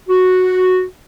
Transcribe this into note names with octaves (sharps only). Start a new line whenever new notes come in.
F#4